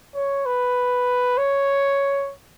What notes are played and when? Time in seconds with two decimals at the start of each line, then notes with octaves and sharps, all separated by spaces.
0.16 C#5
0.46 B4
1.38 C#5